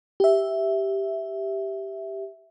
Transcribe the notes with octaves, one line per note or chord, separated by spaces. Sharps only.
G4 E5